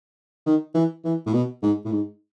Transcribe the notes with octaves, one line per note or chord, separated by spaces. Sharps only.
D#3
E3
E3
A2
B2
G#2
A2
G#2